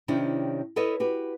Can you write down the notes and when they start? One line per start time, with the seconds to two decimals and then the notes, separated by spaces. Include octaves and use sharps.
0.08 C3 D#3 C#4 D4 E4 G4
0.76 E4 A4 B4 C#5 D#5
1.00 F#4 G4 B4